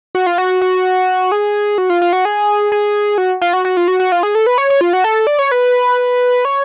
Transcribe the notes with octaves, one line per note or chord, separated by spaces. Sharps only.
F#4
F4
F#4
F#4
G#4
F#4
F4
F4
F#4
G#4
G#4
F#4
F4
F#4
F#4
F4
F#4
F#4
F4
G#4
A4
B4
C#5
C#5
F4
F#4
A4
D5
C#5
B4
C#5